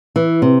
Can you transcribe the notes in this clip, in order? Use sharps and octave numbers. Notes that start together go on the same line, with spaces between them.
E3
C3